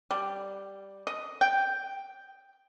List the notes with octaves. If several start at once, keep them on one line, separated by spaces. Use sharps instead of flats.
G3
D#5
G5